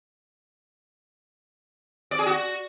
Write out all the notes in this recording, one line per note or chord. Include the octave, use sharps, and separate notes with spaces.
D5
G#4
F#4